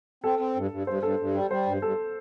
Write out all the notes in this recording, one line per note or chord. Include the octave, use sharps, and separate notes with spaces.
C4 A4
C4
G2
G2
G2 C5
G2 A4
G2
G3
G3 C5
G2
G2 A4